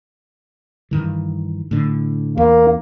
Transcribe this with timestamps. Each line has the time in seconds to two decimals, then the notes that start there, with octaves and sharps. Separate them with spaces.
0.91 G2 D#3 E3
1.71 A2 D3
2.38 E2 A#3